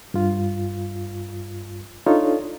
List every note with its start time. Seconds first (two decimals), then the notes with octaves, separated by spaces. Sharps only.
0.14 G2 F4
2.06 D4 D#4 F4 A4 C#5